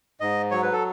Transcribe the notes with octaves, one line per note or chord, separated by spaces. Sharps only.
G#2 D#5
F#3 C#5
B4
A4